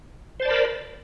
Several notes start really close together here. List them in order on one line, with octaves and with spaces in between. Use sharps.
C5 A5 D5 B5 A#4